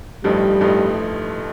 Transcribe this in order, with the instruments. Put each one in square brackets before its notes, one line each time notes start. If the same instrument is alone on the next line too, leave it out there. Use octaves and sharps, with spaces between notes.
[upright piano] A1 G2 F3 A3 D#4 [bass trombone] G3
[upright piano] A1 G2 F3 A3 D#4